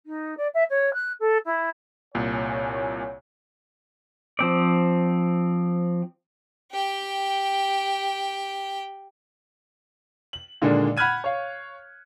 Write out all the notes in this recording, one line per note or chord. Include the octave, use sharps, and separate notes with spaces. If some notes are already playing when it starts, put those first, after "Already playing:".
D#4
D5
E5
C#5
F#6
A4
E4
C2 A#2 C#5 G#5
F3 C4 D5
G4 G5
F#7
A#2 D3 D#3 G#3 A#3 D4
F#5 B5 F6 F#6 G#6 D#7
C#5 F5